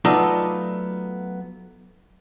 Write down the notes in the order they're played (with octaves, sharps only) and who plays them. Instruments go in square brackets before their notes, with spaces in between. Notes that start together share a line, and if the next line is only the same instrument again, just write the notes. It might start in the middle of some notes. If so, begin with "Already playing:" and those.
[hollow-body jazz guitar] F#3 A3 B3 D#4 F4 D5